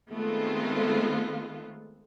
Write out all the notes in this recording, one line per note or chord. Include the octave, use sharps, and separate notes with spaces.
D#3 G#3 A3 B3 C4 F4